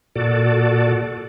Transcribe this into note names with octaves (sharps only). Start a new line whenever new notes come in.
A#2 F#4 A4 D5